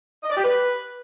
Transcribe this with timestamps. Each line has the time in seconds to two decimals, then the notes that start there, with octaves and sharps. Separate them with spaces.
0.23 D#5
0.30 D5
0.37 G4
0.44 B4